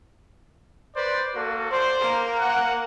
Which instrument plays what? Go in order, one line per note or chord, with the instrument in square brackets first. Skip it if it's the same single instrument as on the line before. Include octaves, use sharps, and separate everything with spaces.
[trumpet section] B4 C5 D5
A#3 F#4 A4
[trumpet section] C5 [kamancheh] D5
[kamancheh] A#3 A#4
[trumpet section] F#5